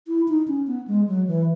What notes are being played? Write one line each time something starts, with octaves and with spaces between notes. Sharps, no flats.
E4
D#4
C#4
B3
G#3
F#3
E3